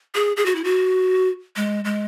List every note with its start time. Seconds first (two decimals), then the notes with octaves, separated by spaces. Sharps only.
0.15 G#4
0.37 G#4
0.46 F#4
0.55 E4
0.64 F#4
1.56 G#3
1.85 G#3